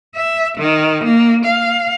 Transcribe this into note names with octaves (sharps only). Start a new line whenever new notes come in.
E5
D#3
A#3
F5